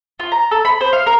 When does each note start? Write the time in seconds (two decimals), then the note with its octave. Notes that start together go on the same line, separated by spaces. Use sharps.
0.20 F4
0.32 A#5
0.51 A4
0.65 B5
0.81 C5
0.93 F5
1.06 A#4